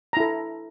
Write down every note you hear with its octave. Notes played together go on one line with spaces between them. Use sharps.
E4 A4 A#5